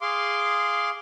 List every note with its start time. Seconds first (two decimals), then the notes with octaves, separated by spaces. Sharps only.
0.01 G#4 F5 C6 D6